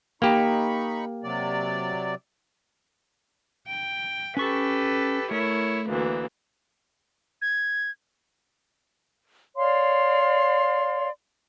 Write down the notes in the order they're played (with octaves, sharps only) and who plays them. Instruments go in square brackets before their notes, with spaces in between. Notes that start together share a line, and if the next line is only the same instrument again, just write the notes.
[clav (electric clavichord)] A#3 G4 [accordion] D#4 B5 C#6
[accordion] C3 F#3 D5
[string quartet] G5
[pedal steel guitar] C#4 C#6 [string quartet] G4 A4 B4
[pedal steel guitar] A3 [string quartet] E4 A#4 C#5
[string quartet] D2 E3 A#3
[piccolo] G#6
[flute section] C#5 D5 F5 C6